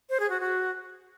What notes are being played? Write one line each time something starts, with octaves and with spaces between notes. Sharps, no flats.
C5
G#4
F#4
F#4